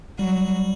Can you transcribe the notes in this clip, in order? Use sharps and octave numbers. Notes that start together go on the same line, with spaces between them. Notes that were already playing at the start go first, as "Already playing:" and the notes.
F#3 G3